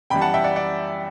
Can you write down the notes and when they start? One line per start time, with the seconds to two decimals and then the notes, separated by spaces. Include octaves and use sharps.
0.10 F#2 E3 G3 G5 B5
0.21 F#5 A5
0.34 E5 G5
0.44 D5 F#5
0.56 D5 F#5